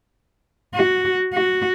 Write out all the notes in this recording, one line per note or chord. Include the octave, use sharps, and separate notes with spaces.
F#4
F#4